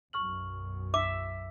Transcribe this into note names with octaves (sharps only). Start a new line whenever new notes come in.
B1 F#2 C#6 F6 F#7
E5 D6